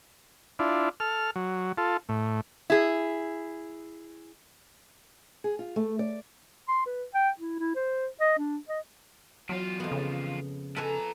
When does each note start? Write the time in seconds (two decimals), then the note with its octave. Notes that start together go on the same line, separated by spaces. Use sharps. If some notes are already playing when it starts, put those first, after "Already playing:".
0.59 D4 E4 F4
1.00 A4 F6
1.36 F#3
1.78 F4 A4
2.09 A2
2.70 E4 G#4
5.44 G#4
5.59 F4
5.76 A3
5.99 D5
6.68 C6
6.86 B4
7.14 G5
7.40 E4
7.60 E4
7.76 C5
8.21 D#5
8.38 D4
8.69 D#5
9.49 E2 F#3 F4
9.80 F2 B3
9.92 C#3
10.76 F3 A4 B4 G#5 A#5